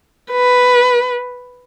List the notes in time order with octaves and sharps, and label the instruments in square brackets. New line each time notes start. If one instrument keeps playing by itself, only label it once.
[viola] B4